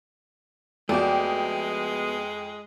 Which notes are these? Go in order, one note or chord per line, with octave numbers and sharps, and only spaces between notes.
F2 G#3 A3 B3 F#4 D5 G5